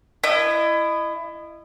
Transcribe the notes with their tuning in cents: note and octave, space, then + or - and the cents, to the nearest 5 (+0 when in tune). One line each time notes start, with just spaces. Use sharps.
E4 +20 D#5 -20